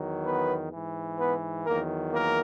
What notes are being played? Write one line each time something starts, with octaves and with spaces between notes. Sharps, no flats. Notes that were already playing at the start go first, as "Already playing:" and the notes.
Already playing: E2 D#3 F#3
B3 B4
G#2 E3
B3 B4
E2 D#3 F#3 A#3 A#4
A#3 A#4